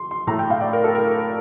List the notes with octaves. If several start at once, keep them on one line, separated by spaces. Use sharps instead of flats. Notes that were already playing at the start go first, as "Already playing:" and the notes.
Already playing: C6
C6
A2 A3 A#5
G5
F5
D5
A#4
A4
A#4